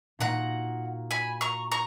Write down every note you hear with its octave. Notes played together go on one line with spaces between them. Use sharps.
A#2 A#3 D#4 F#4 A#4 F#5 A#5
G#5 B5
A#5 C#6
A#5 C#6